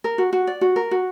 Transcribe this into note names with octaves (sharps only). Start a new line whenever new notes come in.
A#4
F#4
F#4
D5
F#4
A#4
F#4